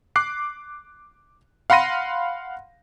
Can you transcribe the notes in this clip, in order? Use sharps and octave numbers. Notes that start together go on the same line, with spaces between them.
D6 F#6 C7
F5 F#5 B5 C6 A#6 D#7